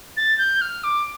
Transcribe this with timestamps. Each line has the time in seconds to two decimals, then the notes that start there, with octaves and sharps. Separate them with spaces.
0.16 A6
0.38 G6
0.61 F6
0.83 D6